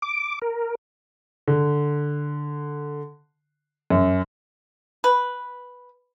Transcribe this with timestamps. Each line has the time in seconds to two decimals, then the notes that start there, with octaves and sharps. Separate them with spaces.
0.02 D6
0.42 A#4
1.48 D3
3.90 F#2
5.04 B4